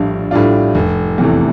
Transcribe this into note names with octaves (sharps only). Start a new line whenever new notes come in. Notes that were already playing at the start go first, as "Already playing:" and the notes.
Already playing: A#1 A2 G3 D4 F4
A2 G3 D4 F4
F1
E2 C3 E3 A3